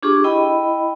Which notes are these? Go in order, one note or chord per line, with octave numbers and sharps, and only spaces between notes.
D4 F4 G4 G#4 C#6 D6
E4 D#5 G5 B5